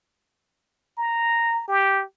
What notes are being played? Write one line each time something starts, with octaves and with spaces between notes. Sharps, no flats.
A#5
G4